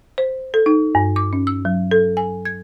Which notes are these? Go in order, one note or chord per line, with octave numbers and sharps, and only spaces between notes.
C5
A4
D#4
G2
D6
C#4
E6
F#3
A4
G#5
G#6